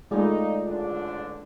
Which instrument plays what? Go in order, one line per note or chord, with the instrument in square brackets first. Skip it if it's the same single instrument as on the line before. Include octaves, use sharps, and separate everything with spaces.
[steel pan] G#3 A3 [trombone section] D#4 [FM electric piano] F4 G#4 D5
[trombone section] A1 D3 D4